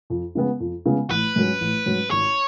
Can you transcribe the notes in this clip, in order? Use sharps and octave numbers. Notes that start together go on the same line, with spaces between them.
F2
C#3 G#3 B3
F2
C#3 G#3 B3
A1 B4
G#2 F#3 C#4
A1
G#2 F#3 C#4
G#1 C#5